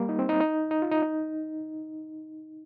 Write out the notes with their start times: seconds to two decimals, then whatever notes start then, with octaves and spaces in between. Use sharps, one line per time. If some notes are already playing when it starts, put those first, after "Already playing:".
Already playing: G3 A#3
0.09 D#4
0.19 C4
0.29 D#4
0.40 D#4
0.71 D#4
0.82 F4
0.91 D#4
1.03 D#4